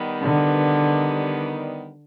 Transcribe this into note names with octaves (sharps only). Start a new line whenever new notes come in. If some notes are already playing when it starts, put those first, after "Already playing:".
Already playing: D#3 G3 B3
D3